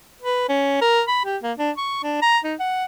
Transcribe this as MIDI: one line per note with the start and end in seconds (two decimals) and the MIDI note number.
0.22 0.47 71
0.49 0.79 61
0.82 1.02 70
1.08 1.24 83
1.25 1.37 67
1.43 1.52 58
1.58 1.71 62
1.77 2.02 85
2.03 2.19 62
2.22 2.38 82
2.44 2.55 63
2.60 2.85 78